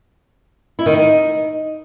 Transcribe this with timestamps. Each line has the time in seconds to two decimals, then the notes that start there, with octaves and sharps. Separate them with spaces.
0.79 E4
0.86 D#3
0.93 D#4